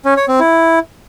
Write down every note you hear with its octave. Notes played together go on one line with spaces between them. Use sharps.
C#4
C#5
C4
E4